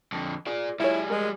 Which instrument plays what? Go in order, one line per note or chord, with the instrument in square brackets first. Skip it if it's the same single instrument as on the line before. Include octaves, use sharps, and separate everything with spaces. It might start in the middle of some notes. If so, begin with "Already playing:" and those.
[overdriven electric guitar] F2 D3
[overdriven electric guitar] F4 D5 [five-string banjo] G#4
[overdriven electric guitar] G3 G#4 [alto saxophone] E4 [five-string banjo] F4 C#5
[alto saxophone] G#3 [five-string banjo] A#4